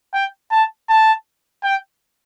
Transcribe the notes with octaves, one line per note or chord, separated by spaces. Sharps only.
G5
A5
A5
G5